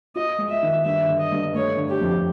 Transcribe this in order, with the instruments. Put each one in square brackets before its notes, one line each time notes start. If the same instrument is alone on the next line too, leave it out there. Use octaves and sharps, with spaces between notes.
[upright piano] F4 [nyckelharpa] D#5
[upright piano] G#3
[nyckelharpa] E5
[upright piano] D#3
[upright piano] G2 [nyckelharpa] E5
[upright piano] D3
[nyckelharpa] D#5
[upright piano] G2
[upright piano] A3 [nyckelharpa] C#5
[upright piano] D3
[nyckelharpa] G4
[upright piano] F2